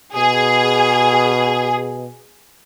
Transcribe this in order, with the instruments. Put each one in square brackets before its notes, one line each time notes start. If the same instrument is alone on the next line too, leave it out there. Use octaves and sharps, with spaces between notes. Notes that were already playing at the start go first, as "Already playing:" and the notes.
[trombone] B2 [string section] G#4